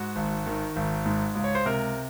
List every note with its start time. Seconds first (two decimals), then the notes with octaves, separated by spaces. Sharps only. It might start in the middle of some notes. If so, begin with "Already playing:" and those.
Already playing: G#2 F#4
0.16 G#1
0.47 D#3
0.76 G#1
1.05 G#2
1.35 C#2
1.44 C#5
1.55 C5
1.65 C3 A#4